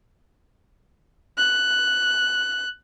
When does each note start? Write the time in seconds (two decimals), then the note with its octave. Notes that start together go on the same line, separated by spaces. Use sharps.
1.37 F#6